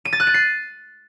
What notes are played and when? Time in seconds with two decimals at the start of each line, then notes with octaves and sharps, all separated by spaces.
0.05 D#7
0.13 A6
0.20 F#6
0.27 D#7
0.34 C7